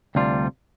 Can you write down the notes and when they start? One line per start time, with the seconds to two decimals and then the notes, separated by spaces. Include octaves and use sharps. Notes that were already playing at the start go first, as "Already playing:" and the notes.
0.15 D2 C3 G3 D4 F4